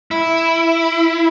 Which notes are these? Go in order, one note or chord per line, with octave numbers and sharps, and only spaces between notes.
E4